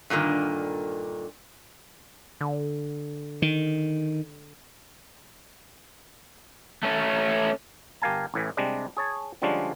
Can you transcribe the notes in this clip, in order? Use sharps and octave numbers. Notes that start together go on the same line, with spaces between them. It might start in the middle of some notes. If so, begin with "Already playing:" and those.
G2 A#2 D3 D#3
D3
D#3
A3 C#4
G1 G4 A#4 F5 G#5 A5
A1 A2 E3
C3 G3 G#3 D4
G#4 C#5 A5
D3 F3 G3 G#3 C#4 D4